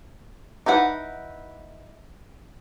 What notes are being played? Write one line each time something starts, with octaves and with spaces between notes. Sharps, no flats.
D#4 E4 B4 F#5